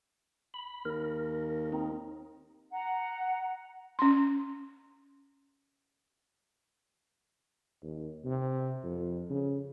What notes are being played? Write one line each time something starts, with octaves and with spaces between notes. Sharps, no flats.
B5
D#2 A#4
C4 D#4
F#5 A#5
C#4 C6
D#2
C3
F2
C#3